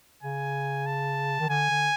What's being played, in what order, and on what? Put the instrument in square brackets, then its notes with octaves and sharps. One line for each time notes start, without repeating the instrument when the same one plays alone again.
[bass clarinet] C#3 [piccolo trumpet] G#5
[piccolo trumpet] A5
[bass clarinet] D#3
[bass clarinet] D3 [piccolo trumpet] G#5
[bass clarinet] D3